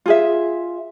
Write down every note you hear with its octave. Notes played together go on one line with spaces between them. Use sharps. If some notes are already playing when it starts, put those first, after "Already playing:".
F4 G#4 E5